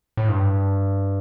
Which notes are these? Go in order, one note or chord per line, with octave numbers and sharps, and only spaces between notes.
A2
G2